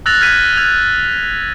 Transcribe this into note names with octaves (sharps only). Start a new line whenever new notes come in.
E6 F#6 A6 A#6 F7
F6 G#6 B6 D#7
F6 F#6 G#6 F7